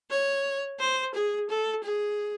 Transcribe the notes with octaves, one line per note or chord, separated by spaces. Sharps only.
C#5
C5
G#4
A4
G#4